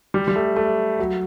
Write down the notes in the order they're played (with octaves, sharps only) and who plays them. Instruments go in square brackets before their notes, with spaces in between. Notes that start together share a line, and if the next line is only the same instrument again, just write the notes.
[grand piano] G3
G3
A3
A3
F#3